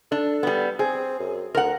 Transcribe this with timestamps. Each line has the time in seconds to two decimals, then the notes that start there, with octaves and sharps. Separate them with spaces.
0.12 D4 A4
0.43 G3 B3
0.79 C4 G#4
1.20 F#2
1.55 D2 A#4 F#5